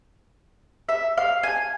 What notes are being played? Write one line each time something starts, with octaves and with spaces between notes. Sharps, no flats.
E5
F5
G#5